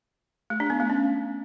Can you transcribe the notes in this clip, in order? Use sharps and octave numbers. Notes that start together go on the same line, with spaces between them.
A3
D4
B3
A3
C#4